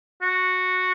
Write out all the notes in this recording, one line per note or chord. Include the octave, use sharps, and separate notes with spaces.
F#4